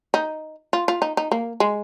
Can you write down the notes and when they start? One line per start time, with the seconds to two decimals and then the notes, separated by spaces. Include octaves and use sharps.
0.14 D#4
0.73 F4
0.88 F4
1.02 D#4
1.17 D#4
1.32 A#3
1.60 G#3